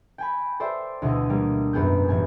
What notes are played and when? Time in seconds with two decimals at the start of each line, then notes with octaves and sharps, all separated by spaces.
0.18 G5 G#5 B5
0.60 A4 C5 D5 E5 G5
1.02 D2 B2 E4 D#5
1.29 G3 A#3
1.73 G#1 F#2 B3 G#4 G5 G6
2.08 E1 A1 G#5